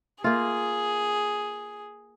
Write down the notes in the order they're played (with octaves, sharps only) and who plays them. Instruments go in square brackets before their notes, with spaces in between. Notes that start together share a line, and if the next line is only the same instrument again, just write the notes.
[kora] A#3 F4 [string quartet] G#4